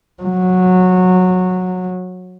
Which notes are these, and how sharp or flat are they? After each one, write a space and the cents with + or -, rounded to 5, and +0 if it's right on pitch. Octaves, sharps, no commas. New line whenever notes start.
F#3 -15